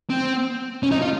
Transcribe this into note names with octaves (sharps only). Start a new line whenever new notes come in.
C4
C#4
D#4
F4